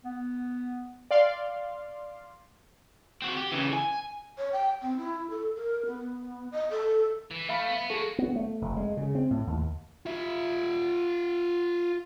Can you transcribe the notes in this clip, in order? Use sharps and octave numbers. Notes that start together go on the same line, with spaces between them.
B3
D5 F5 C6
C4 F#4
G4
C#3 E3
G#5
C#5
G5
C4
E4
A4
A#4
B3
D#5
A4
E3
A3 E5 F5 B5
B3
A#3 F#4 G#4 A4
B3
A3
F1
G#3
C#3
C4
A2
D#2
F4 E5